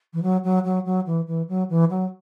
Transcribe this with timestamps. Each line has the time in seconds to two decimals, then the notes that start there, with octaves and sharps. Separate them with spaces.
0.13 E3
0.22 F#3
0.44 F#3
0.64 F#3
0.85 F#3
1.06 E3
1.27 E3
1.49 F#3
1.69 E3
1.90 F#3